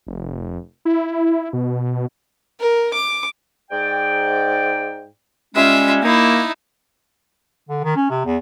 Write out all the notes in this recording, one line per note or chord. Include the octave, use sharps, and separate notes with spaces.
F1
E4
B2
A#4
D6
G#2 D5 G5
G3 G#3 C#4 F4 E5
A#3 D#4 E4
D3
D#3
C#4
C3
E2